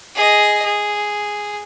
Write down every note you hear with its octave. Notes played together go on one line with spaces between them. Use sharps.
G#4 D#5
G#4